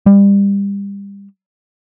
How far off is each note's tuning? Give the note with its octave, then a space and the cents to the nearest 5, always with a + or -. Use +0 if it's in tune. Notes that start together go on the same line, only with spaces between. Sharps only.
G3 +30